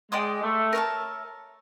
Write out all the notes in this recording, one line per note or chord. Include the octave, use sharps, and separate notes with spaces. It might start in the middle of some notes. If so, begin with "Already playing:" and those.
G#3 D5 G5 C6 D#6
A3
A#4 C#5 E5 A5